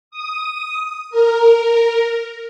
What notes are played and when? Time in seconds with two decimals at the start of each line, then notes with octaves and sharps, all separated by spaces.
0.11 D#6
1.10 A#4